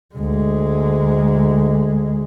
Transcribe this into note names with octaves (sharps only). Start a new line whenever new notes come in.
D2 G#3